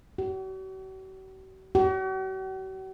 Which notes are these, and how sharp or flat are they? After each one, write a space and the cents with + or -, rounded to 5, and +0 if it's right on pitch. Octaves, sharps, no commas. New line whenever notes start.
F#4 +45
F#4 +45